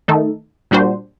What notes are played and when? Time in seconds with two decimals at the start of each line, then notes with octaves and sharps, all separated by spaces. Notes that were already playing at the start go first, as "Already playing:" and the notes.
0.08 D#3 A3 D#4 A4
0.71 A#2 G3 D4 F#4 C5